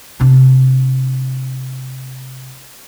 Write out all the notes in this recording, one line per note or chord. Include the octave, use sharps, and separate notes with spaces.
C3 D4